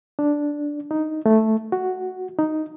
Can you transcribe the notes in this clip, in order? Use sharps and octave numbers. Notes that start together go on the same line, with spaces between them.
D4
D#4
A3
F#4
D#4